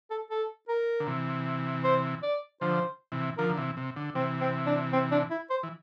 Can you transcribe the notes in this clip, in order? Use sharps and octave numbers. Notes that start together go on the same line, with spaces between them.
A4
A4
A#4
D3
C3 E3
C5
D5
D3 F3 C5
C3 E3
D3 F3 A#4
D3
C3 E3
C3
D3
C3 E3 C4
C4
D4
C4
D4
E4
C5
E3